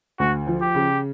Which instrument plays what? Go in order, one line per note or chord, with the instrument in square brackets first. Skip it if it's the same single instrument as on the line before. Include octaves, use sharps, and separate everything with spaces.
[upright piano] D2 [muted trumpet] F#4
[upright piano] F3
[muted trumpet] G4
[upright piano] C#3